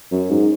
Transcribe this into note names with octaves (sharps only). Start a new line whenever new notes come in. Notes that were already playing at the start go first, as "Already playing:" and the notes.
F#2
G#2